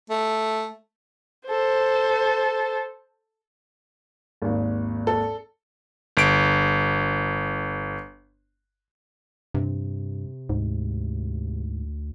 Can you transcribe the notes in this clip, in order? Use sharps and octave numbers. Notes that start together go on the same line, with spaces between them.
A3
A4 C5
G#1 D#2
A4
G1 D7
G2 C3
D2 G#2